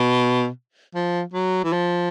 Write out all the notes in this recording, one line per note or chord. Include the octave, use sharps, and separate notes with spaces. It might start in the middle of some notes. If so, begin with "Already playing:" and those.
Already playing: B2
F3
F#3
E3
F3